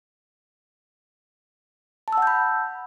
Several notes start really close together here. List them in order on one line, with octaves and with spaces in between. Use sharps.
A5 E6 F#5 G6 B5